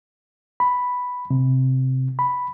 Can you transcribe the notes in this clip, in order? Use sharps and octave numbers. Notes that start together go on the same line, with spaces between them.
B5
C3
B5